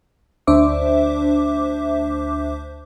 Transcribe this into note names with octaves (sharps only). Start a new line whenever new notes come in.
D2 D4 C5 E5 D6